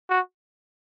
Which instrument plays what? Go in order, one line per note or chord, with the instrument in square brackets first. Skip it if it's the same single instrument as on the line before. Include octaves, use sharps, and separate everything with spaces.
[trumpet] F#4